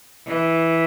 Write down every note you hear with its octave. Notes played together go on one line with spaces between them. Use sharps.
E3